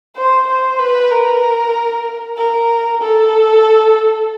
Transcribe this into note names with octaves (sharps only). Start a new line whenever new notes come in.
C5
C5
B4
A#4
A#4
A4